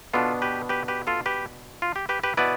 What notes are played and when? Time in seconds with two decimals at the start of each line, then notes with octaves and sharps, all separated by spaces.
0.13 B2 B3 D4 F4 A4
0.42 G4 B4
0.69 G4 B4
0.88 G4 B4
1.07 F4 A4
1.26 G4 B4
1.82 F4
1.96 G4
2.09 G4 B4
2.23 G4 B4
2.37 B2 B3 E4 B4 D5